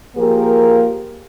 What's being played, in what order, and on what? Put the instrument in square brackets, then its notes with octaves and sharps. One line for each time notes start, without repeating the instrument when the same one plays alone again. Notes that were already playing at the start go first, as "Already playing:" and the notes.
[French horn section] F3 A#3 G4 G#4 A#4